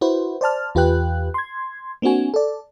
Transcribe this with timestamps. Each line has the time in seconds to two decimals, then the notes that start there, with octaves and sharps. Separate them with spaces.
0.01 E4 F#4 B4 C5
0.41 C5 D5 A5 F6
0.75 E2 F4 G4 B4 G5 F#6
1.34 C6 G#6
2.02 A#3 C4 D4 F#4 G#5
2.34 A4 D5